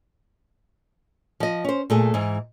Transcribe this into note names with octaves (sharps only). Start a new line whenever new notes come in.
F3 D#5
C#4 C5
A#2 A3 G#4
G#2 E3